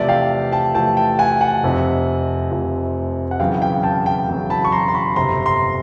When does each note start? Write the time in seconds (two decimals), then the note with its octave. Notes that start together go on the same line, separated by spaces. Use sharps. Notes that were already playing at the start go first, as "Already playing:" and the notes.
Already playing: E2 C3 F3 A3 D5 E5
0.08 F5 G5
0.52 G5 A5
0.75 E2 C3 F3 A3 G5 A5
0.97 G5 A5
1.19 F#5 G#5
1.41 F#5 G#5
1.63 F1 F2 C3 F3
2.51 F1 F2 C3 F3
3.31 F#5
3.40 E1 E2 C#3 F#3 F5 G5
3.62 F5 G5
3.83 G5 A5
4.06 G5 A5
4.28 E1 E2 C#3 F#3
4.50 A5 B5
4.65 C#6
4.72 A#5 C6
4.88 C6
4.94 B5 C#6
5.16 G1 F2 C3 A#5 C6
5.46 A#5 C6